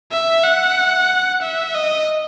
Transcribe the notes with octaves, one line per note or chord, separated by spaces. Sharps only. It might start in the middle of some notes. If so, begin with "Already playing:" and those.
E5
F#5
E5
D#5